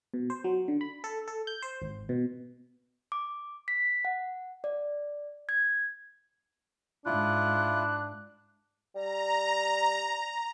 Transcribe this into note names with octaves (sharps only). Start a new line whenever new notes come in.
B2
C5
F#3
D3
B5
A4
A4
G6
C5
G#1
B2
D6
B6
F#5
D5
G#6
G#2 D4 E4 F4 F#6
G3 A#5